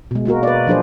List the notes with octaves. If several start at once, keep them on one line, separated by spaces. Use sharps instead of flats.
B2 G#3
G#3 A#3 F#4 A#4
B4 D5
F3 F#3 D4 G#4 C5 D5